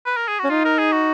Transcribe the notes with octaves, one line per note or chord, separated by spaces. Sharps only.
B4
A#4
G#4
C#4 F#4
D#4 F4
A#4
G#4
F#4